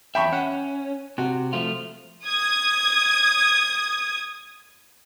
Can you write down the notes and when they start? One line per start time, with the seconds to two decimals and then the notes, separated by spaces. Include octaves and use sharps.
0.15 E2 F#3 E5 G5 B5 C#6
0.33 C#4 F#5
1.18 C3 F#4
1.53 F3 A3 F4
2.25 D#6 G#6